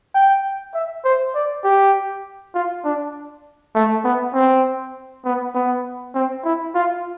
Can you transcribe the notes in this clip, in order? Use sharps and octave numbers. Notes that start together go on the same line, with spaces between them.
G5
E5
C5
D5
G4
F4
D4
A3
B3
C4
B3
B3
C4
E4
F4